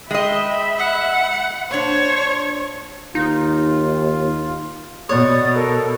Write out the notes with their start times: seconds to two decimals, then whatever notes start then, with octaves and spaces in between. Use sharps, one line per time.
0.11 G#3 D#5 E5 G5 B5
0.79 F#5
1.71 A#2 D4 C5 C#5
3.15 D#2 D#4 F4
5.09 B2 C#5 D5 D#6
5.55 A4 A#4